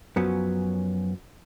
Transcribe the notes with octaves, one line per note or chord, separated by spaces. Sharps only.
F#2 F3 F#3 B3 C#4